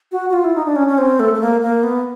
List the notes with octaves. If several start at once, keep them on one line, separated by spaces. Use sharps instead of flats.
F#4
F#4
F4
E4
D#4
D4
C#4
C#4
C4
A3
A3
A#3
A#3
B3